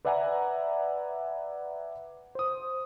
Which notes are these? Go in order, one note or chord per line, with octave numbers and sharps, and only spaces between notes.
B4 D5 E5 F#5 G#5 A#5
C5 D#6